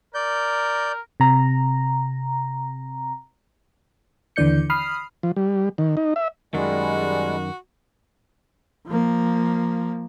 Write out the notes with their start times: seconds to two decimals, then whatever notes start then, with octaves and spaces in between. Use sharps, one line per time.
0.15 A#4 D5 G6
1.20 C3 A#5
4.36 D#2 D3 E3 D5 G6 C#7
4.70 B5 D#6 F6 C7
5.23 F3
5.36 G3
5.78 D#3
5.97 D#4
6.16 E5
6.54 F#2 D#3 G3 G#3 F#4
8.87 F3 A#3